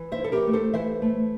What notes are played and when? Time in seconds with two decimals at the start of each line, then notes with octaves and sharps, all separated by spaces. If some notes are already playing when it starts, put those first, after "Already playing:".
Already playing: E3
0.12 C5 E5
0.19 E4
0.24 A4
0.32 G4 A#4
0.47 A3
0.53 A4 C5
0.74 E3 C5 E5
1.02 A3